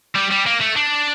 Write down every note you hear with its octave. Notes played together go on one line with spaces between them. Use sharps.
G3
G3
A#3
A3
D4